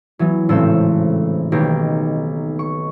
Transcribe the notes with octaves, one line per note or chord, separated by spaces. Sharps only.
E3 F#3 B3
G#1 A2 C#3 C4 A4 E6
B1 B2 D#3 A#3 G4 A#6
C#6